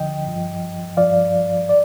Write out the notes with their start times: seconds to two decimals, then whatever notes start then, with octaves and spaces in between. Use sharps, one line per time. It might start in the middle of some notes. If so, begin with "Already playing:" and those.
Already playing: D2 D3 F3 D#5 G5
0.26 G2 F3
0.97 G2 F3 D5 F5
1.69 D5